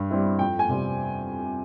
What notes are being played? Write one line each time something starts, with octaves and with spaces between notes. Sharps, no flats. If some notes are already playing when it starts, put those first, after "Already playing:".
Already playing: G2
G3 C4 E4
F2 G5
G#5
C3 G3 C4